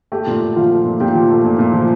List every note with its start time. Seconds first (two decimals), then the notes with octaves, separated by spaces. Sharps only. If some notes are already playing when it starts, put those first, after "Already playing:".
0.12 A3 G4 G5
0.27 A#2
0.42 A#2
0.56 F3 F4 F5
0.71 A3
0.85 A#2
1.00 A#2 G4 G5
1.15 F3
1.30 A3
1.45 A#2
1.59 A#2
1.74 F3